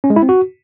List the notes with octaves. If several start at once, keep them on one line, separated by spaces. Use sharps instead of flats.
C#4
G#3
E4
C4
F#4